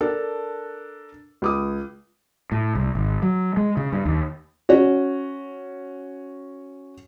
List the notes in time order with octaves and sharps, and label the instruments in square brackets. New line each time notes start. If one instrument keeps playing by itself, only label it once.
[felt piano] D4 A4 A#4
C#2 D6 D#6
[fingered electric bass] A2
C2
G#1
F#3
G#3
C#3
G2
D#2
[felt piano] C#4 F#4